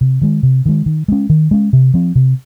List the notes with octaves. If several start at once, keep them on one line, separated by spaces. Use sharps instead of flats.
C3
D#3 G#3
C3
D#3 G#3
D#3
G#3 C#4
D#3
G#3 C#4
C3
F3 C4
C3